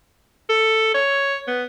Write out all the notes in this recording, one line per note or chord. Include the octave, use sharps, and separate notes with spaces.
A4
C#5
B3